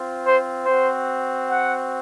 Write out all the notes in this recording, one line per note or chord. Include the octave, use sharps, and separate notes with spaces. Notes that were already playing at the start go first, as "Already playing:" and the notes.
Already playing: C4 F4
C5
C4 F#4 C5
F#5